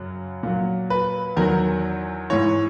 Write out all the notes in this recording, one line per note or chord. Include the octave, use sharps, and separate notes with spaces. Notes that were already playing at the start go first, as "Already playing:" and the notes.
Already playing: F#2 C#3 F#3
A#2 F#3
B4
E2 D#3 F#3 A#4
G#2 E3 C#5